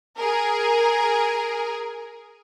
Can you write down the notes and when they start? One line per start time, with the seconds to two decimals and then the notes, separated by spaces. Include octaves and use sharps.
0.17 G#4 A#4